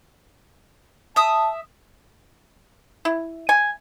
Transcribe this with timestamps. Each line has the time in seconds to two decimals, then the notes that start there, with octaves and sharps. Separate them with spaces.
1.16 E5 A5 D#6
3.05 E4
3.49 G#5